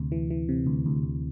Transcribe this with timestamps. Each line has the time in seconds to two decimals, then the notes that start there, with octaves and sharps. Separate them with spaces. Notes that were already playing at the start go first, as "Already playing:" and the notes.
Already playing: D2 C3
0.12 E3
0.31 E3
0.49 C3
0.66 D2
0.86 D2
1.04 D2